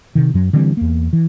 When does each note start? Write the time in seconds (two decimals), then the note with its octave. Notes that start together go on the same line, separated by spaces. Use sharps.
0.15 C3 D#3
0.34 F#2 F#3
0.53 D3 E3 G3 C4
0.77 E2 A#3
1.13 E3